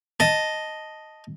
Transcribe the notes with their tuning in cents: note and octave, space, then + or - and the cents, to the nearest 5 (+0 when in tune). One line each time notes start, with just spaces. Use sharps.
D#5 +0 A5 +0